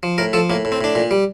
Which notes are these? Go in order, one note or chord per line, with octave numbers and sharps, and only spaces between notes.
F3
A2 A#4
F3 A4
A2 A#3
A2
C4
A2 D4
A#2
G3